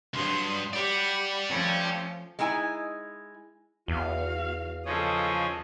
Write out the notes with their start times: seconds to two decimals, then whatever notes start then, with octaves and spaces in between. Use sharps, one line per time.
0.14 C#2 G2 F#3 C6 D#6
0.73 G4 D5 F#5 G5 B5
1.48 F3 A3 C#4
2.39 G#3 D#4 E4 G#5
3.88 E2 F#4 F5
4.85 C#3 F3 C#4 A4 D#5